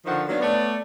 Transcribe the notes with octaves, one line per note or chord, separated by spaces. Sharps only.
D3 D#3 F3 C5 F#5
D#3 F#3 A#3 B3 D4
A3 B3 C#5 D5